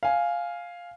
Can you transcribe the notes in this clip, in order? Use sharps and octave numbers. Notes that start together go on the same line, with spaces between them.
F5 G#5